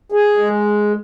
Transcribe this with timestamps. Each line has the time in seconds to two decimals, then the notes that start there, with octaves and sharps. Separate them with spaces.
0.12 G#4
0.37 G#3